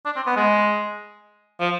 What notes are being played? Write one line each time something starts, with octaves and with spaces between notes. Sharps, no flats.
D4
C4
B3
G#3
F3